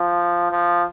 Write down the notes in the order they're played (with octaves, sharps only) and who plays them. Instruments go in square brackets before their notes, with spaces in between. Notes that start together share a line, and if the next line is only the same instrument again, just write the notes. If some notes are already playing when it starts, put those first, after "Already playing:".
Already playing: [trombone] F3
F3